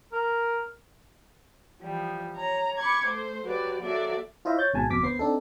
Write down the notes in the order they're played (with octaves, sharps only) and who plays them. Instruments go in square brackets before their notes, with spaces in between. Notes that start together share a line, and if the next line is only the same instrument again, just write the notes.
[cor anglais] A#4
[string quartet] E3 F3 G3
C#5 A#5
B5 C#6 D6 G#6
A3 C5
F#3 F#4 G4 B4 D5
F#3 A#3 F#4 A4 D5 E5
[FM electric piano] E4 F4 C5 D#5 E5
C#5 G6 A6
G#1 G#2 B2 G#5 A5
G1 F2 B2 D6 B6
D2 B3 C5 C7
C4 D4 D#4 A4